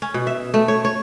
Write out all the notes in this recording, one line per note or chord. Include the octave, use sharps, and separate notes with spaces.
C#4
B2
E5
A3
C#5
C#5